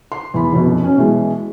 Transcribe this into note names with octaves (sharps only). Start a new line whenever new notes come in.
C6
E2 B5
F1 F#2 B2
C#4
B2 E3 G#3